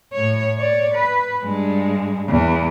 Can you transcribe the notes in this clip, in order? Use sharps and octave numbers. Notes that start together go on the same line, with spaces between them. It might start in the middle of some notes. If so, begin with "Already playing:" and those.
A2 C#5
C#5 D5
B4
G2 G#3
E2